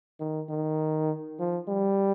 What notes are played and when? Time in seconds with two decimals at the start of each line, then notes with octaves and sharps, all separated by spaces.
0.20 D#3
0.49 D#3
1.39 F3
1.68 G3